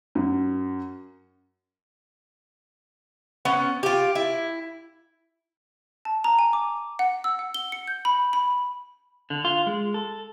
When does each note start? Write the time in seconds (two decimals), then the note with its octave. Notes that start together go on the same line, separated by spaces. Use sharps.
0.15 F#2
3.45 B3 C#4 F#5
3.83 F4 G4
4.15 E4
6.05 A5
6.24 A#5
6.39 G#5
6.53 D6
6.99 F#5
7.24 E6
7.39 F#5
7.54 G7
7.72 C#7
7.88 G6
8.05 B5
8.33 B5
9.30 D3
9.45 F4
9.67 G#3
9.94 A4